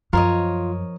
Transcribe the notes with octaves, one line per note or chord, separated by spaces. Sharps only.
F#2 F3 F4 A#4 C#5 D#5